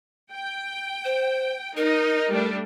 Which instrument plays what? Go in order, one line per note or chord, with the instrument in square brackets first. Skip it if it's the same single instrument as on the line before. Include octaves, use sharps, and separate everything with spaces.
[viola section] G5
[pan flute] C5
[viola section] D#4 [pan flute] A#4
[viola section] G3 A3 D4